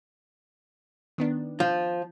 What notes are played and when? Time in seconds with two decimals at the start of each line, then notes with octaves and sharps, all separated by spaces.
1.18 D#3 B3 D4
1.60 F3 G6